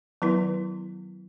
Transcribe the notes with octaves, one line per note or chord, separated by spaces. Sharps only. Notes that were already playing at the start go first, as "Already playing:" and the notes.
D#3 F#3 B3 E4 B4